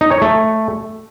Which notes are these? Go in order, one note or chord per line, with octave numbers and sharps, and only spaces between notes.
D#4
C#5
A3